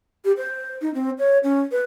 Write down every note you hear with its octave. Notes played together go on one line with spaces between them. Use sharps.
G4
C5
D#4
C4
C#5
C#4
B4